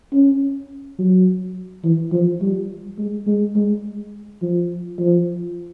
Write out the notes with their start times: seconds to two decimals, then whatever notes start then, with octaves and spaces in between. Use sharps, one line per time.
0.13 C#4
0.98 F#3
1.84 E3
2.12 F3
2.42 G3
2.98 G#3
3.27 G#3
3.56 G#3
4.42 F3
4.99 F3